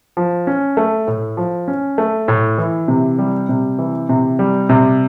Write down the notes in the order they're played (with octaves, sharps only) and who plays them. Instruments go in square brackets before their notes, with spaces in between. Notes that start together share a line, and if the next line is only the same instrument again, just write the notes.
[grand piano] F3
C#4
A3
A2
F3
C#4
A3
A2
E3
C3
G3
C3
E3
C3
G3
C3